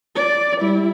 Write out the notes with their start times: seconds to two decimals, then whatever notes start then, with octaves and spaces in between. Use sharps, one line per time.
0.15 D5
0.61 G3 E4